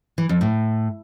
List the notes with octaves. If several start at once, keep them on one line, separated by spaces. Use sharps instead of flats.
E3
F2
A2